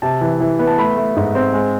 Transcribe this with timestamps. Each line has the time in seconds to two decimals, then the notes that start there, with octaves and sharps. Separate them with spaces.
0.02 C3 A5
0.21 E3
0.40 E3
0.59 B3
0.67 A5
0.78 A3 B5
0.96 A3
1.16 G#2
1.35 C4
1.54 G#3